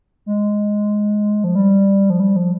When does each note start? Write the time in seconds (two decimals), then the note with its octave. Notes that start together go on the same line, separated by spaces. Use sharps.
0.26 G#3
1.44 F3
1.55 G3
2.10 F3
2.20 G3
2.36 F3